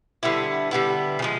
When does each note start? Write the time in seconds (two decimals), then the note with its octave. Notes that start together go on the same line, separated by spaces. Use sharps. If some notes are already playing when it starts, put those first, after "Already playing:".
0.23 D3 G3 B3 E4
0.71 D3 G3 B3 E4
1.19 C#3
1.22 F3 G#3